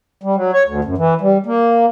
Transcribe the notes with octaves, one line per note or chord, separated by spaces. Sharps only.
G3
F#3
C#5
D2
F#2
E3
G3
A#3